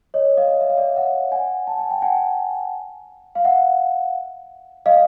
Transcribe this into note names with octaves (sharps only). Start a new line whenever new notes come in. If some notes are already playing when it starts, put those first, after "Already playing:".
C#5 D#5
D#5 F5
E5
F5
D5 E5
E5 F#5
F#5 G#5
A5
G#5
G5
F#5 G#5
F5
E5 F#5
D#5 F5